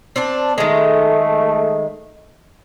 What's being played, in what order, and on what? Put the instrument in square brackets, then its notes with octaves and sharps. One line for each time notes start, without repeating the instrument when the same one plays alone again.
[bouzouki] C4 D4 A5
[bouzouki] D#3 G#3 [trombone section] A3